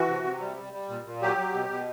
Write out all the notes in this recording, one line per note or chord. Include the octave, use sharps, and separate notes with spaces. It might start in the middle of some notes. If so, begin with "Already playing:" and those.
Already playing: E3 F#4
C3
C3
G3
G3
G3
A#2
A#2
F#3 G4
F#3
B2
B2